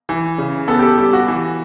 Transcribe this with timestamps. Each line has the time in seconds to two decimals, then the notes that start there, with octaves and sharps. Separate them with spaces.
0.09 E3
0.38 C#3
0.68 B3 A4
0.79 G4
0.82 A4
0.98 G3 G4
1.13 F#4
1.28 E3